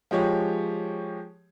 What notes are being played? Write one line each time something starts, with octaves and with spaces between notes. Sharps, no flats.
F3 G#3 G4 C#5